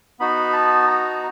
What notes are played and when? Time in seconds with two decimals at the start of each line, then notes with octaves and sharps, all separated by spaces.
0.20 B3 D#4 F#4 B5
0.53 A5
0.87 A#5